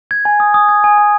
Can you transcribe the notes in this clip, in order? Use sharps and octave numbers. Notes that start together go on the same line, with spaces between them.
G#6
G#5
D#6
D#6
G#6
G#5
G#5